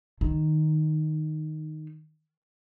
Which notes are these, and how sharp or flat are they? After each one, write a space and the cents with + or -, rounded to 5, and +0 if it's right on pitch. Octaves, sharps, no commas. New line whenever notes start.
D#3 -5